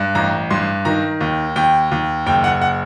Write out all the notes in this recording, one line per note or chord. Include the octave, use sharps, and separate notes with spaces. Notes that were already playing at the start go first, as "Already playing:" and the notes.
Already playing: G2
A1 A#5
G2 C6
D#3 A#5
D#2
D#2 G5
D#2
F#1 G5
F#5
F#5